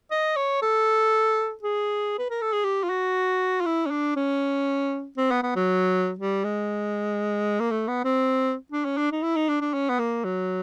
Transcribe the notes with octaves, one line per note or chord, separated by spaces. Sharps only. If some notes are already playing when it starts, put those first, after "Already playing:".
D#5
C#5
A4
G#4
B4
A#4
A4
G#4
G4
F4
F#4
F4
E4
C#4
D4
C#4
C4
B3
B3
F#3
G3
G#3
A#3
A3
B3
C4
D4
C#4
D4
D#4
E4
D#4
D4
D4
C#4
B3
A#3
F#3